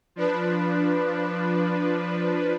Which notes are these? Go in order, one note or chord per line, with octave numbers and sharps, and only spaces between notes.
F3 D4 B4